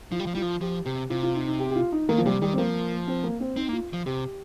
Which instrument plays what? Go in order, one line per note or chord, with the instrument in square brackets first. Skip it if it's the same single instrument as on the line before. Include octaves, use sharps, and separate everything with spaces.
[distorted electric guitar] F3 [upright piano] F4
[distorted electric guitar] G3
F3
[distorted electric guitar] G3 [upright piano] F4
[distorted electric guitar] F3
[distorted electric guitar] F3 [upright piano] G4
[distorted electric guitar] C3 [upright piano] G4
[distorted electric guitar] C3 [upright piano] F4
[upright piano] F4
D#4
D#4
G4
G4
F4
D#4
[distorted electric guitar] D#3 [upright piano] A#3
[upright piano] F3
[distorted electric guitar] C3 [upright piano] G3
[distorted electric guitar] D#3 [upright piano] G3
[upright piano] C4
[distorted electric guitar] F3 [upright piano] A#3
[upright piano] C4
A#3
C4
[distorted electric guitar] C4 [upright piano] D#4
[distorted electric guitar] A#3
[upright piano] F4
[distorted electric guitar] F3
[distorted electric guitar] C3 [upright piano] G4